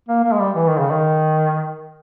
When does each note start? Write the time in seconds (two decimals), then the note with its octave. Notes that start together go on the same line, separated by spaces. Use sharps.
0.09 A#3
0.24 A#3
0.32 G#3
0.39 G3
0.55 E3
0.67 D#3
0.79 C#3
0.91 D#3